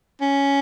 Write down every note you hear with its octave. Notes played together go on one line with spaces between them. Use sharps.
C#4